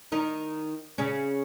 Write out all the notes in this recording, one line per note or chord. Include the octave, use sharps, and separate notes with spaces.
D#3 D#4
C#3 C#4